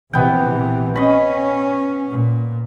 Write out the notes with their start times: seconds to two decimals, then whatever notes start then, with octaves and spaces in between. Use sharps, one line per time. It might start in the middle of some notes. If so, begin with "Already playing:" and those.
0.13 A#1 C3 E3 B3 G5
0.95 C#4 D#5 B5
2.10 A#2